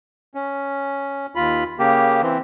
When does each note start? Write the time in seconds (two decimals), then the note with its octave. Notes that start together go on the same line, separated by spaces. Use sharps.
0.35 C#4
1.35 D#2 F4 B5
1.79 C#3 A#3 G4
2.22 E3 C4